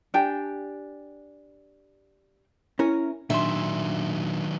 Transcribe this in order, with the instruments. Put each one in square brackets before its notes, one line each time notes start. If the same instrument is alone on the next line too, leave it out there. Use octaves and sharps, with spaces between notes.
[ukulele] D4 G4 G5 G#5
[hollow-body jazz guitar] C#4 A#4 [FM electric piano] E4
[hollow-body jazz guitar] A#2 [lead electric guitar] D#3 F#3 [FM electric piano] D4 [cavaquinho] E5 C6